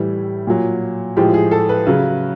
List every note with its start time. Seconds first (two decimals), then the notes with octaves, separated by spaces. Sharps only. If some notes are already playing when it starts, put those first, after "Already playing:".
Already playing: A2 E3 G3
0.47 A#2 F#3
1.16 A2 F3 G#3 G4
1.34 G#4
1.51 A4
1.69 B4
1.87 C#3 F#3